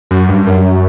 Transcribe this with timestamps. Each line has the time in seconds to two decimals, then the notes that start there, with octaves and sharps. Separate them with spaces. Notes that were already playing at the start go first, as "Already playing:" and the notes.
0.11 F#2
0.29 G2
0.47 F#2